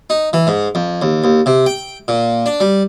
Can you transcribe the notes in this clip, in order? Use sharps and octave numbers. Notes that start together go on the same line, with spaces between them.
D#4
E3
G#2
F2
D#2
D#2
C3
G5
A#2
D4
G3